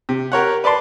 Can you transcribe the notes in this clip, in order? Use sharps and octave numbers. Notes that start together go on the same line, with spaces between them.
C3
G4 A#4 C#5 F#5
B4 D5 A5 C6